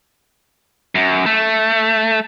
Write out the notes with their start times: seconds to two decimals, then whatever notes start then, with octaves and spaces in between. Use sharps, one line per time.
0.95 F#2
1.26 A3